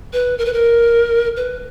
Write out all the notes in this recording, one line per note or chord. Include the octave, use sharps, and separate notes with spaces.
B4
A#4
B4
A#4
B4